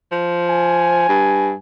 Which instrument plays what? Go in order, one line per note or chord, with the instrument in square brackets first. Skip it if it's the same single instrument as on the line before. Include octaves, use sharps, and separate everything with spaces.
[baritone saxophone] F3
[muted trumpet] G#5
[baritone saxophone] G2